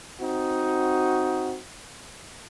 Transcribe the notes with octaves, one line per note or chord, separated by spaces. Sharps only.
C4 D#4 F#4